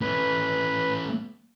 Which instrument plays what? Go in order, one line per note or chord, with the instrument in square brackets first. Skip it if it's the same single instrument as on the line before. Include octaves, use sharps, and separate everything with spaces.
[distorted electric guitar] A3 C#4 [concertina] B4